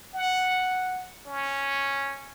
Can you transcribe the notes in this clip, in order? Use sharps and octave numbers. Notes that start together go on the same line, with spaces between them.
F#5
C#4